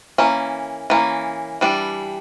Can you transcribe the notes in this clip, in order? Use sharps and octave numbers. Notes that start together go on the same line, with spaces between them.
E3 A#3 C#4
E3 A#3 C#4
E3 G3 D4